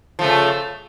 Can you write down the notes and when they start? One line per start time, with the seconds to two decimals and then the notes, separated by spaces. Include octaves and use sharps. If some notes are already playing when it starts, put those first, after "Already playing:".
0.19 F3
0.21 A3
0.24 C#3